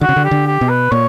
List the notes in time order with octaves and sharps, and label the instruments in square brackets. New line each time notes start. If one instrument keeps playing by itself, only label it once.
[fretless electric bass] D3 [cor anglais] F#4
[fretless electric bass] C#3
D3
[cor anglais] G4
[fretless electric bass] D3
[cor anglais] G4
[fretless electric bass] B2
[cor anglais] B4
[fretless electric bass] A#2 [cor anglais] C#5